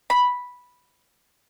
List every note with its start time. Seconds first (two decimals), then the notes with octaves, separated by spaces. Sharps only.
0.10 B5